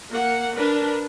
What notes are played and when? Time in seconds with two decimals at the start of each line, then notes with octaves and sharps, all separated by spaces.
0.10 A#3 F#5
0.57 D4 A#4 B4